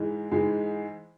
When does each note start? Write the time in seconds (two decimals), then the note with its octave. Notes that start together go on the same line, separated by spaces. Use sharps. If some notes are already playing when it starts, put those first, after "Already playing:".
Already playing: G#2 E3 G#3
0.31 G#2 E3 G#3